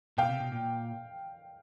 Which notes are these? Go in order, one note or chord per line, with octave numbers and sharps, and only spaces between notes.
B2 F5 G5
C3
B2
A#2